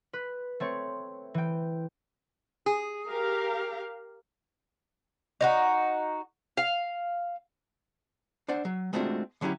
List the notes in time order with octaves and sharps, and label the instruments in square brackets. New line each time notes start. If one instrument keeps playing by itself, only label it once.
[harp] B4
A3 C4 C#5
E3 G5
[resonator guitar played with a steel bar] G#4
[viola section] G4 A#4 F5
[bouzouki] D#4 F4 F#4
F5
[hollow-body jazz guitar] D4 C5 D5 F#5
F#3
G#3 A3 C4 D4 F4 F#4
D3 F#3 C#4 E4 G4